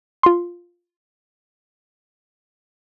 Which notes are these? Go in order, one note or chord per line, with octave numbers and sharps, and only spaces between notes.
F4 C6